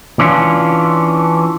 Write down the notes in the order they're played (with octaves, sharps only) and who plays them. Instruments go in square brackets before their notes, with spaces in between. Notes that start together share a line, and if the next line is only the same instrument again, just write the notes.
[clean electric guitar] E3 C#4 D4 F4